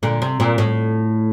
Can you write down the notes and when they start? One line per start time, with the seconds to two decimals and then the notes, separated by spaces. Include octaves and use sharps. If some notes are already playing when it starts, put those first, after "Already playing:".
0.03 A#2 D3
0.22 C3
0.40 A#2
0.58 A2